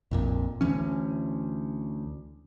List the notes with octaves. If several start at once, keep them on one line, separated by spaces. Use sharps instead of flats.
A#1 F2 A#2
D2 E3 C#4